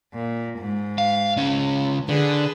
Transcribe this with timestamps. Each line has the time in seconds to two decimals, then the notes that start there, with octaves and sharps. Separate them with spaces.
0.14 A#2
0.59 G#2
0.98 F5
1.37 C#2 C#4
2.09 D3 G#4 B4